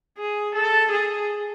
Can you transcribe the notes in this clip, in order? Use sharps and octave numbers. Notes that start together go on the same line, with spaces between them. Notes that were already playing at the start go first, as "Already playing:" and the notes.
G#4
A4
G#4